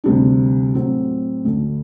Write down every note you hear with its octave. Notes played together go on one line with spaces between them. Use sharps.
D2 C3 G3 D4
A2 F#3 C4
D2 D3 A3